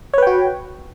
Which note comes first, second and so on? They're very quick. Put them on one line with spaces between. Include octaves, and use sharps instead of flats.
C#5 B4 G5 F#4